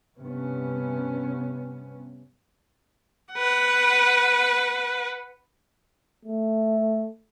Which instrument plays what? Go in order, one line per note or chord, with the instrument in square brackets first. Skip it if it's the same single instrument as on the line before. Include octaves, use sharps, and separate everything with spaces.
[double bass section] G2 C3 B3 C#4
[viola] B4 F#5
[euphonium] A3